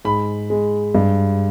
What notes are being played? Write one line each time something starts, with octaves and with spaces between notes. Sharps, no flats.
G#2 B5
G#3
G2